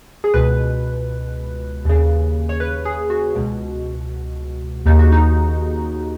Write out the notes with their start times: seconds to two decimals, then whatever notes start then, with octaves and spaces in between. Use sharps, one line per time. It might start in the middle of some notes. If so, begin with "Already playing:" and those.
0.24 G#4
0.34 C#2 B2 B4
1.85 D#2 C#3
2.49 C#5
2.60 B4
2.85 G#4
3.10 F#4
3.35 C#2 B2
4.86 D#2 C#3 D#4
4.99 F#4
5.12 D#4